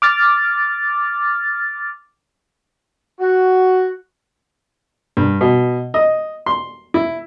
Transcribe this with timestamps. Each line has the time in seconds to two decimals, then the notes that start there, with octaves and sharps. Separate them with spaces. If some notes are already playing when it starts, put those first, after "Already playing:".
0.02 D6 F6 A6
3.20 F#4
5.17 G2
5.41 B2
5.94 D#5
6.46 C6
6.94 E4